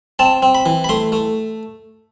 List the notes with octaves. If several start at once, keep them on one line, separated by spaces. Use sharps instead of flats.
C4 A5
C4
B5
E3
B5
A3 C6
A3